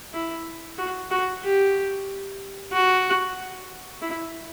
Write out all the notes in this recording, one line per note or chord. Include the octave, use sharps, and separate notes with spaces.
E4
F#4
F#4
G4
F#4
E4